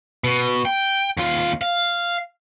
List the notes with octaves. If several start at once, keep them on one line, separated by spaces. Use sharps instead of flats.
B2
G5
D#2 F4
F5